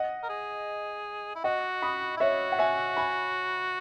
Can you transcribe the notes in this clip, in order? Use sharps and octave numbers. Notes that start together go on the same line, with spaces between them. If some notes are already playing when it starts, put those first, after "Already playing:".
Already playing: D#5 F#5
A#4
G#4
E4
F#4 D#5 F#5
B5 D#6
E4
F#4 C#5 E5
F#5
E5 G#5
G#5 B5